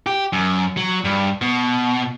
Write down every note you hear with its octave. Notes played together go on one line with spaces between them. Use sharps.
G4
F#2
F#3
G2
B2